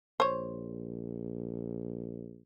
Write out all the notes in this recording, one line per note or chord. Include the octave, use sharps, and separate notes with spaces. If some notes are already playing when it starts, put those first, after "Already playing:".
A#1 C5 C#5